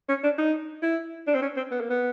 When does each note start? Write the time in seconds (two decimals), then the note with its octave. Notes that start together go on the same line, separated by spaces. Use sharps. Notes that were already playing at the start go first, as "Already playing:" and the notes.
0.09 C#4
0.23 D4
0.38 D#4
0.82 E4
1.27 D4
1.35 C4
1.42 C#4
1.56 C4
1.71 B3
1.81 A#3
1.90 B3